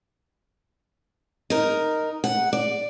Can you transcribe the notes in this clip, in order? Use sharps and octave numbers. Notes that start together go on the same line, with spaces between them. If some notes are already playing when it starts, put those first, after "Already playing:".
D#4 A#4
F#5
D5